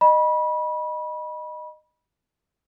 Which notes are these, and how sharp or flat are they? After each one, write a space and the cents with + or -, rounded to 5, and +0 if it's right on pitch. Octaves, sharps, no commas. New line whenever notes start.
D#5 -15 B5 -25